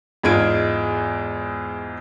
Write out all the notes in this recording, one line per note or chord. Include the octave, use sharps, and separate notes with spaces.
E2 G#2 G#3 F4 G#6 D7